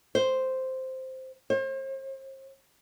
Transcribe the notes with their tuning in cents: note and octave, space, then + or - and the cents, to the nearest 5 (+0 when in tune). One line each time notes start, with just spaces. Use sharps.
C5 -5
C5 +40